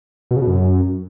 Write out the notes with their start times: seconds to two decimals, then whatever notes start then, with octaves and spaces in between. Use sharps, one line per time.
0.31 B2
0.36 C#3
0.42 B2
0.47 F#2